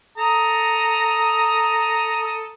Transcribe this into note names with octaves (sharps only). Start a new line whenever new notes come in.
A4 A#5 D#6